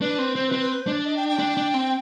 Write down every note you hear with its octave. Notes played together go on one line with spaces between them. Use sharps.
D4 B4
C4
C4 C5
B4
C4
B4
B4
C5
D4
D5
D#5
G5
G5
D4
D4
C4